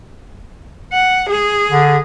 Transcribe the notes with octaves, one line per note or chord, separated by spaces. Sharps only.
F#5
G#4
D3